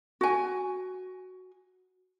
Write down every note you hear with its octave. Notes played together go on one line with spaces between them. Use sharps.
F#4 G#5